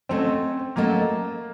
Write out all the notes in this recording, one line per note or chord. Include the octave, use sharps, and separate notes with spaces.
F#3 A3 C4 C#4 A4 D#5
F#3 A3 A#3 C#4 A4 D#5